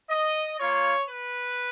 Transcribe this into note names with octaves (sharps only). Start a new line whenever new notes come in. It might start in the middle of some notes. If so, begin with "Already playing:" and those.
D#5
A#3 F4 C#5
B4